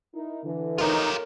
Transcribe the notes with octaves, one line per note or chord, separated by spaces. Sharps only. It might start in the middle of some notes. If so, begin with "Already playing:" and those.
D#4 E4 A#4
D3 E3
D#4 F4 G4 A4 A#4 C#5